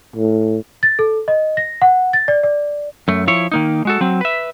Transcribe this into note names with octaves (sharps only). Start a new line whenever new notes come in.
A2
A6
A4
D#5
A#6
F#5
A6
D5
D5
F#2 A3
F3 E4 C#5
D#3 A#3 D#4
G#3 F#4 A4
F#3 C4
B4 E5